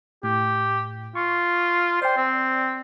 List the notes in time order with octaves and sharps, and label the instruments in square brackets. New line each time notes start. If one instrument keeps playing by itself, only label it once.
[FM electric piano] A2 [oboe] G4
[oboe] F4 [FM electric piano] C#6
[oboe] C5 [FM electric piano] D5 G5
[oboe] C4